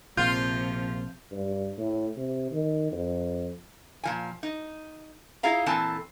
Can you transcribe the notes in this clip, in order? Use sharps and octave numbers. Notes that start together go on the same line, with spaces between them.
A#1 C3 F3 F4 G6
G2
A2
C3
D#3
F2
A#2 F3 G#5
D#4
E4 F4 G#4 F5 A#5
A#2 E3 C4 A4 G#5 A5